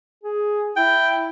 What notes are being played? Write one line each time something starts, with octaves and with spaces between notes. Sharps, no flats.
G#4
E4 G5